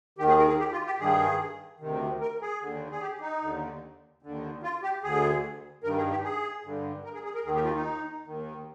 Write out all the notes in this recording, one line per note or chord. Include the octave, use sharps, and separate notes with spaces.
D#2 D#3 G4
G#4
A#4
G#4
G4
F4
G4
G2 D#3 G#4
D2 C3 D#3
A#4
G#4
D#2 D3
G#4
G4
D#4
D#2 D3
D#2 D3
F4
G4
D2 D3 G#4
G2 D#3 A#4
G#4
G4
G#4
G2 D3
A#4
G#4
G#4
A#4
D#2 D#3 G#4
G4
F4
D#4
D#2 D#3